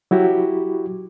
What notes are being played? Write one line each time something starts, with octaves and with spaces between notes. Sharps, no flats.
F#3 E4 F#4 G4